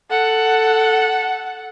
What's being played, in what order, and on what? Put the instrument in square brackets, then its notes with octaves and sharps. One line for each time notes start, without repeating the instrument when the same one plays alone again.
[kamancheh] A4 F#5